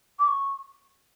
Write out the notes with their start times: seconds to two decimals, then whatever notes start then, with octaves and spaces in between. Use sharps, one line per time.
0.19 D6
0.27 C#6